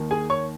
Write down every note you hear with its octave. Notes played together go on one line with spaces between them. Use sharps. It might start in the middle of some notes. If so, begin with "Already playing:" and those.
Already playing: D#2 D#3 A#3
G#4 G#5
C#5 C#6